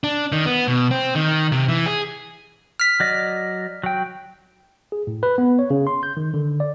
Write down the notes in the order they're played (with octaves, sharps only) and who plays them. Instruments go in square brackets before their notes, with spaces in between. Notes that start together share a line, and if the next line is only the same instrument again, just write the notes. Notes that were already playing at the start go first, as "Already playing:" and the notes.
[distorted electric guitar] D4
D#3
B3
B2
C4
D#3
C3
E3
G#4
[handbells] F6 B6
[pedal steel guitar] F#3 D5 D#5
F#3 G5
[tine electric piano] G#4
A2
B4
B3
C#5
C#3
C6
G6
D#3
D3
D5